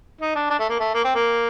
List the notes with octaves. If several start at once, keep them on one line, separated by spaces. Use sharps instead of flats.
D#4
D4
D4
A3
A#3
A3
A#3
C4
A#3